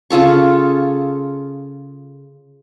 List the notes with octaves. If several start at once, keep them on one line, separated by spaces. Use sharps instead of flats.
C#3 F4 A4 C#6